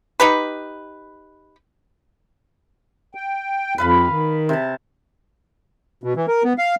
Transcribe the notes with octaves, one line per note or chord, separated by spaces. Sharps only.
D#4 G4 B4
G5
F2 B4 F5 B5
D#3
C3 A5
B2
E3
A#4
B3
F5